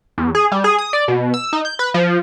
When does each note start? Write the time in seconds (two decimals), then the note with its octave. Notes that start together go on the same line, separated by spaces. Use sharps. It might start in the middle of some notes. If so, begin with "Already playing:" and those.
0.18 E2
0.35 G#4
0.52 G3
0.64 G#4
0.78 D#6
0.93 D5
1.08 B2
1.34 E6
1.53 D#4
1.65 G6
1.79 B4
1.94 F3